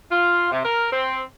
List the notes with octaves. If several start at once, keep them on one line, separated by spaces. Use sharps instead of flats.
F4
C3
A#4
C4